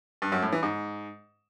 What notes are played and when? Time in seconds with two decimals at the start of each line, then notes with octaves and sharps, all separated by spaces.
0.22 G2
0.32 F#2
0.42 A2
0.52 E3
0.63 G#2